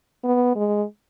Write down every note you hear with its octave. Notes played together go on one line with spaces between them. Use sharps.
B3
G#3